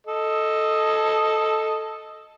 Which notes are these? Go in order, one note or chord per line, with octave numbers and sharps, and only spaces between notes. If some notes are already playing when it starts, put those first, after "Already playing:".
A4 D#5